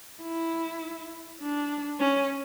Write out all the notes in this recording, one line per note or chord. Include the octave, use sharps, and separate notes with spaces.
E4
D4
C#4